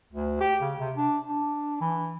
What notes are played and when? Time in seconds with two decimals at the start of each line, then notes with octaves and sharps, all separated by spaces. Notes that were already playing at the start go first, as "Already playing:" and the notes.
0.13 D2
0.41 G4
0.61 C#3
0.80 C3
0.97 D4
1.29 D4
1.81 E3